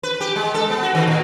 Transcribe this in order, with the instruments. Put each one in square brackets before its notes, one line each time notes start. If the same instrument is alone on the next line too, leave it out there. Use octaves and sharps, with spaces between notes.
[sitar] B4
G4
G#3
A4
B3
F#4
D#3
A#2